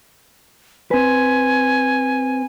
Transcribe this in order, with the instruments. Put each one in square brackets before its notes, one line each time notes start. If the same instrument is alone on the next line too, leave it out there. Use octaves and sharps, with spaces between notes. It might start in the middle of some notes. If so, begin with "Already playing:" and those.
[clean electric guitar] C4 B4 [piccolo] G#5